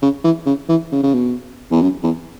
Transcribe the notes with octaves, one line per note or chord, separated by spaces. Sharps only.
C#3
E3
C#3
E3
C#3
C#3
B2
E2
F#2
E2